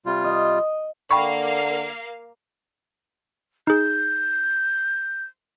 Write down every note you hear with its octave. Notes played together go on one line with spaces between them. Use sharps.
C3 G3 F4
D#5
D3 A#3 F5 G5 B5 C#6
D#4 G#4 G6